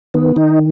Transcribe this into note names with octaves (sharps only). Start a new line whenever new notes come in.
D#3 B3
D#3 D#4